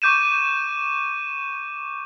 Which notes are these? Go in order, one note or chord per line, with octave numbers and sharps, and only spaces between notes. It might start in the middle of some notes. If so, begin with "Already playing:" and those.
C#6 D6 G6 D#7 E7